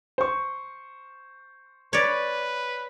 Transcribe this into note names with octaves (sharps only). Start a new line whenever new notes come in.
C5 C#6
B4 C#5 D5